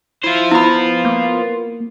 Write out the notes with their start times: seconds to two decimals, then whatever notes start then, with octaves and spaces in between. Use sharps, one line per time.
0.24 E4 F4 C5
0.51 B3 E4 B5
1.05 A#3